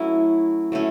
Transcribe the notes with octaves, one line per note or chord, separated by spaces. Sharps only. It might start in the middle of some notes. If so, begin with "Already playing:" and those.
Already playing: F#3 A3 C#4 E4
F#3 A3 C#4 E4